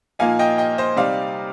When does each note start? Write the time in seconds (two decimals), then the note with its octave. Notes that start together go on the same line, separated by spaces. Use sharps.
0.19 A#2 F3 A#3 D#4 F5 G#5
0.39 D#5 G5
0.58 D#5 G5
0.78 C5 D#5
0.96 C3 G3 C4 D#4 D5 F5